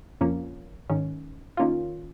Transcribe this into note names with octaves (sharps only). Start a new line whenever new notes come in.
F2 F3 A#3 C#4
G#2 D#3 C#4
D#3 A#3 C#4 F4